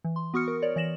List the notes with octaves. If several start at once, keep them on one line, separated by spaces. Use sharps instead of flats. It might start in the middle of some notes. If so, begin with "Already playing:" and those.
E3
C6
B3 F#4 C#6 D#6 F6 C#7
A#4
A#4 C#5 D5
E3 D5 A#6 E7 F#7